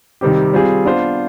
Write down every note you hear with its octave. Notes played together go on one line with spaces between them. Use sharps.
C3 D#3 G3 C4 G4
G3 C4 F4 G#4
B3 D4 F4 C5